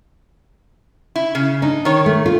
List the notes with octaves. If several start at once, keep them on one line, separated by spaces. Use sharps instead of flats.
E4
C#3
D4 D#4
D#3 C#5
A3
F4